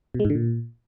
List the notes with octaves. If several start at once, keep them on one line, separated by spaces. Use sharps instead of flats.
B2
G#3
G#2
D3
A#2